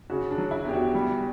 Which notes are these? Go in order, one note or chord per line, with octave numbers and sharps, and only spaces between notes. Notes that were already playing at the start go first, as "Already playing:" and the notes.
C#3 F#4
D4
F#3
E4
E2 G4
F#4
G3